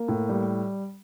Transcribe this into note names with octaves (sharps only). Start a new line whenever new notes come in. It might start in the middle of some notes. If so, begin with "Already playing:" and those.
Already playing: A#3
A2
G3